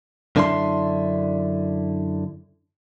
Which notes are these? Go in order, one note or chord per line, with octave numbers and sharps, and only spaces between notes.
F#2 D3 D4 E4 G#4 C6